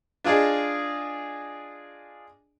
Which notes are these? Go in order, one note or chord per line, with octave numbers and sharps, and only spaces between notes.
D4 F4 G#4 D5 D#5